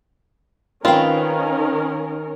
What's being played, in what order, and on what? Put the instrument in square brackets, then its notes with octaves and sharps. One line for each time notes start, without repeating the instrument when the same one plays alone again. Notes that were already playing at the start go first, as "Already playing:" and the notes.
[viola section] D#3 C#4 A#4 [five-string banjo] C4 F4 [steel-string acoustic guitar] B4 F5